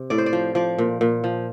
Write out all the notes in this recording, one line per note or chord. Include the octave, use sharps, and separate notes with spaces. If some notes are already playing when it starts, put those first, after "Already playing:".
Already playing: C3
A2 D5
C5
D5
F3
F3 D5
A#2
A#2
F3